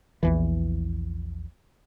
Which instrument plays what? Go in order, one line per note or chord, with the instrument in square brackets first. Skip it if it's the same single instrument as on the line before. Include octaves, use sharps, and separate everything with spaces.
[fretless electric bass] A#1 E2 E3